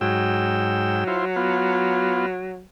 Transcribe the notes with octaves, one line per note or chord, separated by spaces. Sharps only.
G#2 F#3 G5 E6
E4 F4 C5
B3 F4